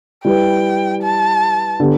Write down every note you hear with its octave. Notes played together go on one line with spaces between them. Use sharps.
G3 E4 B4 G5
A5
D3 B3 G4